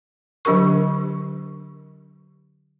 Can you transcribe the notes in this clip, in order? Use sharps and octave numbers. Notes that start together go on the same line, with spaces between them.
D3 F#3 D4 G4 A#4 C#6